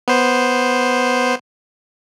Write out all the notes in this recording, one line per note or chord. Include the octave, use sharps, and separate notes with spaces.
B3 C5